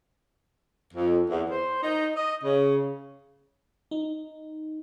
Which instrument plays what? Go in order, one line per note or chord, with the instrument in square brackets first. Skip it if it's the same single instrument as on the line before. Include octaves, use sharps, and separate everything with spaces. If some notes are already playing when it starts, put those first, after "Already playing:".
[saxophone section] F2
E2
C5
D#4
D#5
C#3
[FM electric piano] D#4